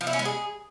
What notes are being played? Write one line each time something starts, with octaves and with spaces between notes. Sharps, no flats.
F3
E4
C#4
G#3
G#4